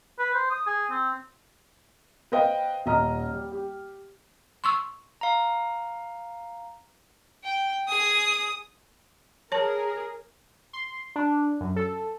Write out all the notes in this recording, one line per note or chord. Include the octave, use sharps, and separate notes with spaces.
B4
C5
D#6
G#4
C4
B4 C5 D#5 F5 G5
D#1 D#5 A#5 F6
G3
G4
C6 C#6 E6
F5 A#5
G5
G#4 G#5 D#6
G#4 A#4 C#5 A5
C6
D4
F#2
A4